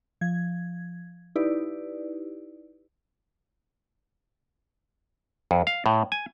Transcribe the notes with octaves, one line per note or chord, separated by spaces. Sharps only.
F3 G#6
D#4 E4 G4 B4 D5
F2
F5
A2
G#5